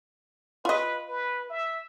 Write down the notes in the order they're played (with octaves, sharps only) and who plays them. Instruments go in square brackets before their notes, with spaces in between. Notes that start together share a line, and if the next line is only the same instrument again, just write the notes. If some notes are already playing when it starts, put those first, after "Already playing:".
[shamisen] F4 D#5 [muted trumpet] B4
[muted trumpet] B4
E5